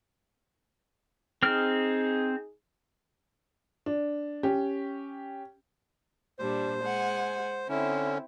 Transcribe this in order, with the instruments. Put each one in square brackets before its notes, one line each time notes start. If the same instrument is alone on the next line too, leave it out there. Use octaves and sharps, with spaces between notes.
[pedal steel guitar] C4 F6 [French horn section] D#4 G#4
[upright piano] D4
C#4 G4
[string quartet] A#2 G3 D4 [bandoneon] C5
[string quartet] G#3 F#5 G#5
[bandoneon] D3 C#4 [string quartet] C4 E4